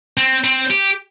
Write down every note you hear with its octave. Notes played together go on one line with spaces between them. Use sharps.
C4
C4
G4